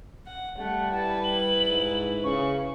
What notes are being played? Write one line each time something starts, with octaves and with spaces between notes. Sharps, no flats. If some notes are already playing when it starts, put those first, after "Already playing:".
F#5
G3 A3 F#5
E4 B4 A5
F#7
G#2
C#3 C#6